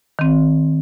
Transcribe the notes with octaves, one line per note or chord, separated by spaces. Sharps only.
D#3 C4